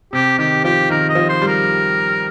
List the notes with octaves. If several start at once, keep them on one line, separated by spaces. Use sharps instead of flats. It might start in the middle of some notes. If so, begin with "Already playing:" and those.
C3 G4
D#3 G4
F3 G4
D#3 A#4
D#5
F3
C5
G3
A#4